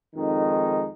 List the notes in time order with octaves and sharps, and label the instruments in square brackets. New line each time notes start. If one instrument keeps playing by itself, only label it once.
[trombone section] F2 D#3 G#3 D#4